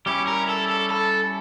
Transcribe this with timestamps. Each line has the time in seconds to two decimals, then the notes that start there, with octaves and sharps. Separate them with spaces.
0.06 G3 C#4 E4 G4
0.27 A#4
0.49 A4
0.70 A4
0.91 A4